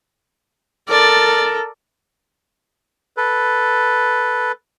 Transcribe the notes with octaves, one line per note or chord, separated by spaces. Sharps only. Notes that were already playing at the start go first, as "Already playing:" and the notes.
A4 A#4 D5
A4 B4